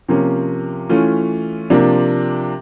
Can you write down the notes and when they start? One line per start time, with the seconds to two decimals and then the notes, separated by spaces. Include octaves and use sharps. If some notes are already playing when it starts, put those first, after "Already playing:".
0.08 C3 F3 A#3 C#4
0.89 E3 A3 C#4 F4
1.70 C3 F3 A#3 D4